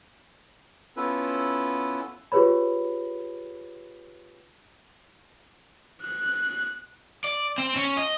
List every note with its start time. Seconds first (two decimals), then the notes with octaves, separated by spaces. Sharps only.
0.97 B3 C#4 E4 F4 A4 B4
2.32 F4 G4 G#4 B4 C#5 B5
6.02 F#6
7.24 D5
7.58 C4
7.76 C#4
7.97 D#5